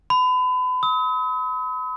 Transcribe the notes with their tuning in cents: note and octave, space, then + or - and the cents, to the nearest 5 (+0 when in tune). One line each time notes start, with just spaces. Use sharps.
B5 +35
D#6 +45